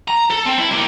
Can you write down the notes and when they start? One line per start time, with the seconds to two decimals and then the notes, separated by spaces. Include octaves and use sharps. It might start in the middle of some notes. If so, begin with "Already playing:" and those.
0.08 A#5
0.30 A4
0.45 C4
0.58 E4
0.71 A#3 G4